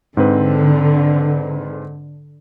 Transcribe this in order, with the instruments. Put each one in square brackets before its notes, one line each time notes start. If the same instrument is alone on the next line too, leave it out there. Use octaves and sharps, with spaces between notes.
[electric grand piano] G#2 C4 B4 [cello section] D3